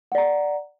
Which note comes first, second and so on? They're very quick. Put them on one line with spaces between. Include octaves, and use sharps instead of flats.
F#5 D5 A#5